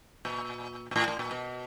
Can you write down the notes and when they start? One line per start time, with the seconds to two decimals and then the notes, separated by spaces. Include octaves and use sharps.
0.25 A#2
0.91 A#2
0.96 A2
1.08 A2
1.19 A#2
1.31 B2